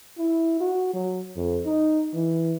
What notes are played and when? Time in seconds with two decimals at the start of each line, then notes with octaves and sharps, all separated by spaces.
0.18 E4
0.60 F#4
0.94 F#3
1.36 F2
1.66 D#4
2.14 E3